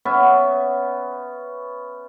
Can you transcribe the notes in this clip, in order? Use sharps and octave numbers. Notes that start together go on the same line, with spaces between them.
B3 C#4 E5